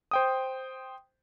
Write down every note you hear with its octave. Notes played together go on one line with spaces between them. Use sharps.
C5 G5 D#6